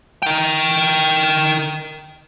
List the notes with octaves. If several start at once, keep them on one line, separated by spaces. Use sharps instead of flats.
A#4 G5